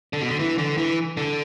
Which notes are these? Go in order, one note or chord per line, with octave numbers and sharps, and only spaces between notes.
D3
B2
D3
E3
D3
E3
D3